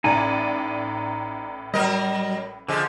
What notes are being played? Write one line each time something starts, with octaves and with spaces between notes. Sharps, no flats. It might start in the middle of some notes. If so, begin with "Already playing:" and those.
A1 A2 D#4 D5 G#5
F#3 G3 A#4 D#5
D3 F3 G#3